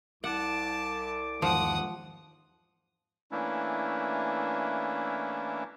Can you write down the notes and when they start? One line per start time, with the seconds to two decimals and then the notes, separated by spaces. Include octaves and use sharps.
0.24 C2 F#5 A5 D6
1.42 E2 G#2 D#3 F3 F#5 D#6
3.31 E3 A3 A#3 C#4 D4 E4